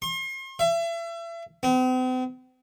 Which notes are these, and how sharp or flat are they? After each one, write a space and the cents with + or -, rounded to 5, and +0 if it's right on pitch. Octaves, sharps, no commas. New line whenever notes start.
C6 +40
E5 +35
C4 -45